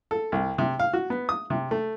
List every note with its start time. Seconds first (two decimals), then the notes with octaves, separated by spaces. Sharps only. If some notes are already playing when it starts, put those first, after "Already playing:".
0.11 A4
0.32 C2
0.58 C3
0.80 F5
0.93 F#4
1.10 B3
1.29 D#6
1.50 C3
1.71 A3